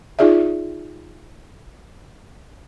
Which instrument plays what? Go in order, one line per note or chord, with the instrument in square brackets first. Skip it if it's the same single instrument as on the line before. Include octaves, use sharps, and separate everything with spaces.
[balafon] D#4 F4 G#4 D5 E5